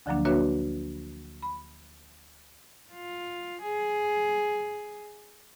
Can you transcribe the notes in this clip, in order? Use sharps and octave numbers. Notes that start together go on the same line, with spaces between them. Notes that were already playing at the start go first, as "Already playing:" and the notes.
D2 D3 F3 F#3 A#3 D4
A#3 D4 F#4 B4 C#5 E5
B5
F4
G#4